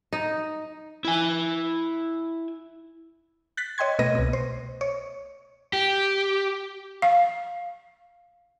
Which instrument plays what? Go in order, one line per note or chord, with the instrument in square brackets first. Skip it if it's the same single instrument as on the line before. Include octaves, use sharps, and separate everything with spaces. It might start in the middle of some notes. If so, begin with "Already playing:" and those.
[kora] D#4
[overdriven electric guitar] E4 G#5
[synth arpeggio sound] F#6 A6 B6
C#5 D#5 G5 C6 G#6
B2 A3 B4 D#5 A#6 D#7
C2 B2
C5
C#5
[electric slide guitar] G4
[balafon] F5